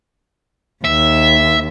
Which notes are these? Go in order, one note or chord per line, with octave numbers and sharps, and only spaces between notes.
D#2 E5